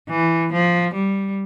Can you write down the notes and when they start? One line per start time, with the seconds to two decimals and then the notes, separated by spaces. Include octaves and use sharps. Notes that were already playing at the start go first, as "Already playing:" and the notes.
0.10 E3
0.53 F3
0.94 G3